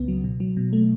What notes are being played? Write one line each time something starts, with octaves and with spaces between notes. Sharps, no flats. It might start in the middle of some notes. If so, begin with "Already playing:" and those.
Already playing: C#2 C#3 B3
F#3
B2
F#3
B2
A3